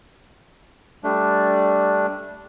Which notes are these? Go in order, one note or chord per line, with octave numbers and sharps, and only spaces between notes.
G3 A3 D4